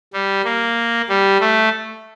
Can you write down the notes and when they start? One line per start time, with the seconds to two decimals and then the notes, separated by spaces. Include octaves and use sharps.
0.13 G3
0.44 A#3
1.09 G3
1.41 A3